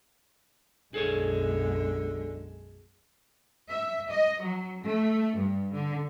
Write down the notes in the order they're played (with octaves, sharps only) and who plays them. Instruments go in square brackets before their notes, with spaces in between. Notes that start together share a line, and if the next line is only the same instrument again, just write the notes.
[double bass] B1 F#2 [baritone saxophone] D3 [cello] F#3 G#3 [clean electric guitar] G#4 A4 C#5
[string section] E5
D#5
F#3
A3
G2
D3